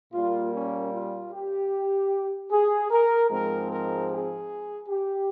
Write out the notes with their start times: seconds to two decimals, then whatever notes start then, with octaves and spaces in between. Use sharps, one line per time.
0.13 A#2 G3 A#3 F4
0.54 C#4
0.93 F4
1.33 G4
2.51 G#4
2.91 A#4
3.31 G#2 F3 G#3 C4 A#4
3.70 A#4
4.10 G#4
4.89 G4